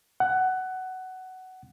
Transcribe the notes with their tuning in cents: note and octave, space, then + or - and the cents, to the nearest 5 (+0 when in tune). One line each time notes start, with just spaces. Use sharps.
F#5 +15